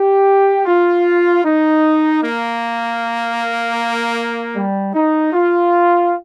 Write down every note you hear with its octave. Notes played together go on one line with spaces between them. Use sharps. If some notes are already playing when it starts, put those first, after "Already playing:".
Already playing: G4
F4
D#4
A#3
G3
D#4
F4